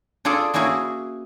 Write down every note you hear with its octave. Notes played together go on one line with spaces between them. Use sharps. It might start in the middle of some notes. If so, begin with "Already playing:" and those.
D4 F4 G#4 A4 D5
A#3 C#4 E4 F#4 G#4